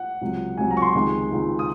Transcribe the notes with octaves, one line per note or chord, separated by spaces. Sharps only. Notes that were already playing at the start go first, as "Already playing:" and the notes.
Already playing: F#5
C#2 C3 F#3
C#2 C3 F#3 G#5
A#5
C#6
C6
C#2 C3 D#3 G#3
C#2 C3 D#3 G#3
D#6